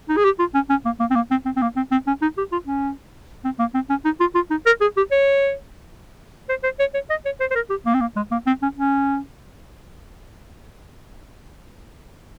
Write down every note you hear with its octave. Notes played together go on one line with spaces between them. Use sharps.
D#4
G#4
G4
F4
C#4
C#4
A#3
A#3
C4
A#3
C4
C4
C4
A#3
C4
C4
C#4
D#4
G4
F4
C#4
C4
A#3
C4
C#4
D#4
F4
F4
D#4
A#4
G#4
G4
C#5
C5
C5
C#5
C#5
D#5
C#5
C5
C5
A#4
G4
A#3
C4
A#3
G#3
A#3
C4
C#4
C#4